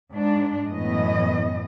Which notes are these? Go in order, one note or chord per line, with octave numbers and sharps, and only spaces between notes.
G#2 D4
F#2 A2 E3 B3 D#5